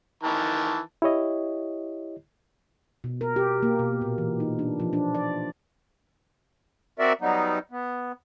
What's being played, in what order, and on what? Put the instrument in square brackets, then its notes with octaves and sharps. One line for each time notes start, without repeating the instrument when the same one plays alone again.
[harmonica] D#3 E3 A5
[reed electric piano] E4 G4 C#5 D#5
[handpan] B2
A#4
G4
A#3
B2
A#2
E3
D#4
D4
F3
D4
D5
[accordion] C4 F#4 A#4 D5 E5
F#3 G3 B3 D#4
B3